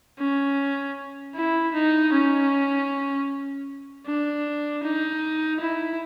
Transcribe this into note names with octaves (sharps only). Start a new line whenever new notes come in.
C#4
E4
D#4
C#4
D4
D#4
E4